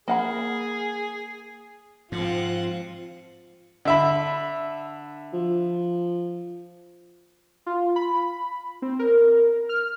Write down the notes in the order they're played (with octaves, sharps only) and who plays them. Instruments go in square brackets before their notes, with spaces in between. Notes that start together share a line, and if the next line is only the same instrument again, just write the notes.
[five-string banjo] A#3 F#5 B5 [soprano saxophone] G#4
[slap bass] G#2 [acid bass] F3 [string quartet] C4 F#5 [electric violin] F4
[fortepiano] D3 E5 B5
[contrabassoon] F3
[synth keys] F4
B5
C4
A#4
F6